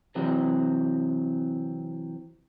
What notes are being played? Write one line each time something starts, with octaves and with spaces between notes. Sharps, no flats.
C3 E3 F#3 C4 F#4